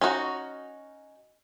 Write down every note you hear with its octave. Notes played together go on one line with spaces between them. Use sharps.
C#4 D#4 F4 F#4